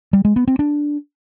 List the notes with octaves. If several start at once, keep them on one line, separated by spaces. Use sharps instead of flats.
G3
G#3
B3
C4
D4